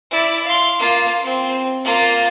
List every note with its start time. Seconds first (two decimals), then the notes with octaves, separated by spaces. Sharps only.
0.11 E4 D5
0.44 F5 C6
0.79 A#3 F4
1.23 C4
1.84 A#3 F4